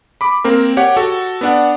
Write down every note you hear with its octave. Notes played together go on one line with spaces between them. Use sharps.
B5 D6
A#3 C4 A#4
G4 C#5 F#5
F#4 A4
B3 D4 F#5